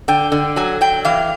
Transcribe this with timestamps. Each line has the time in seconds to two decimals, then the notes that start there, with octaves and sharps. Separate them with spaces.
0.08 D3 G5
0.32 D3
0.56 F#3 G#5
0.81 F#3 G5
1.05 E3 F5